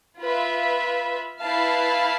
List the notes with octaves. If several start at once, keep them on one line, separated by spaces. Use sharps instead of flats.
F4 B4 E5
E4 B4 F5 A5